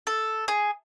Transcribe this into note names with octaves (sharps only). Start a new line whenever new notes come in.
A4
G#4